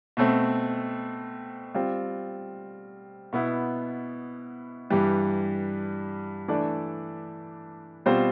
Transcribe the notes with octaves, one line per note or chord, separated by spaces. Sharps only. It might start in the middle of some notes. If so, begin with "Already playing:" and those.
B2 A3 C4
G3 C4 F4
B2 B3 E4
G2 E3 G3
E3 A3 D4 A4 D5
B2 G3 C4 F4 C5